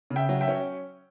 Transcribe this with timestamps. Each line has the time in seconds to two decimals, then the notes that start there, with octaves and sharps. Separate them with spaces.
0.10 C#3
0.16 E5 G5
0.29 F#3
0.41 E5 G5
0.48 C#4